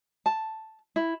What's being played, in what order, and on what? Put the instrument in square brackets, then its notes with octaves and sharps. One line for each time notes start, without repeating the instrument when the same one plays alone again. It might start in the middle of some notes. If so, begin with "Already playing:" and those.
[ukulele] A5
E4